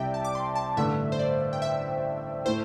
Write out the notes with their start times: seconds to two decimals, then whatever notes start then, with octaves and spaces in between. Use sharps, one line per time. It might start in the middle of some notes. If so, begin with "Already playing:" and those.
Already playing: C2 C3 G3 D5 E5 G5
0.14 A5
0.25 D6
0.35 C6
0.55 A5
0.77 A1 G2 D3 A3 D4 E5
1.12 C5
1.19 D5
1.53 G5
1.62 E5
2.45 A2 A3 E4 C5